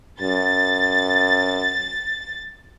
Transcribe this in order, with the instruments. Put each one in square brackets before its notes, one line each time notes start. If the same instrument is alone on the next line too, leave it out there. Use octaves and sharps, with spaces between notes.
[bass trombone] F#2 [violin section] A6